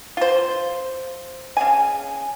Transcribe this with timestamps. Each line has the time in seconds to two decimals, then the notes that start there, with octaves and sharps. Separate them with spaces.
0.17 F4 C5
1.57 C#3 G#4 G#5